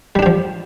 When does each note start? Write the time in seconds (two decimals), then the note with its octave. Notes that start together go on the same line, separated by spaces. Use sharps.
0.15 G3
0.19 D4
0.23 G4
0.26 F3